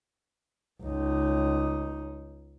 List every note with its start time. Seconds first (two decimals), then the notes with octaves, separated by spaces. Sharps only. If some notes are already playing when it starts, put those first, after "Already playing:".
0.82 C#2 D#4